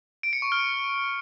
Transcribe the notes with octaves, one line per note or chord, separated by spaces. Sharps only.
D7
C#7
C#6
F6